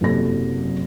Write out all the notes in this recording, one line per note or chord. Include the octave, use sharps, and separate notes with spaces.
F#1 C3 F#3 A4 A#6